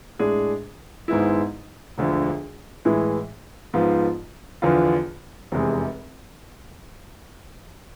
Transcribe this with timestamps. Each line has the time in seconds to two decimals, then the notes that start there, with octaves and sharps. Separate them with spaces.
0.19 A2 G#3 D4 G#4
1.08 G#1 G#2 G#3 B3 E4
1.98 E1 D2 D3 F3
2.85 A2 E3 G#3
3.74 G#2 F3 B3 F4
4.62 E2 D3 F3 B3 F4
5.52 F1 E2 C3 G#3